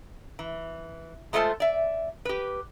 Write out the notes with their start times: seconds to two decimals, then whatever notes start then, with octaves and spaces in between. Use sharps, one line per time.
0.39 E3
1.33 G#3 A3 F4 A4 C5 A5
1.60 D5 E5
2.25 G4 B4